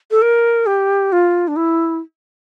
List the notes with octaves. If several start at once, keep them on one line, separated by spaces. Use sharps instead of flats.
A4
A#4
G4
F4
D4
E4